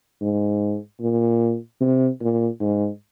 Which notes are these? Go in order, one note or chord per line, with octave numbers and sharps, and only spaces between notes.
G#2
A#2
C3
A#2
G#2